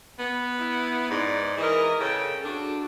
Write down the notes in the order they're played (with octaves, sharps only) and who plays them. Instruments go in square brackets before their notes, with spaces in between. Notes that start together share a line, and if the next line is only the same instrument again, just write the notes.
[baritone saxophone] B3
[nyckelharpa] E4
[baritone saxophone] G#2 [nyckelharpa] D5
[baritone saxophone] E3 [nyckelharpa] A#4 D#5
[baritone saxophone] C#3 [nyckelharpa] A4 G5
[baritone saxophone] D4 [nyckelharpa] F#4 A4